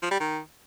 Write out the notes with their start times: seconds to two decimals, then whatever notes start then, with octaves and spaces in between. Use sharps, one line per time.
0.02 F3
0.11 G3
0.20 D#3